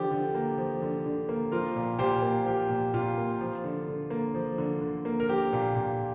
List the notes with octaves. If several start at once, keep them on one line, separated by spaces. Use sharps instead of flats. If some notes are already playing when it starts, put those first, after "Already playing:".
Already playing: D3 F3 G4
D3
A#3
F3
D3
D3
A#3
F3 F4 A#4
A#2
A#2 G4 C5
A#3
F3 G4
A#2
A#2 F4
A#3
F3
D3
D3
A#3
F3
D3
D3
A#3
A#4
F3 G4
A#2
A#2